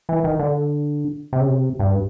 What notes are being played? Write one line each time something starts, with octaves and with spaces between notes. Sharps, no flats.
E3
D#3
D3
C3
C#3
C3
G2